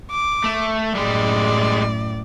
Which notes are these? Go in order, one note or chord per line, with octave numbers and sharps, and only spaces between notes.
D6
A3
F#2 A2 G3 G#3 D5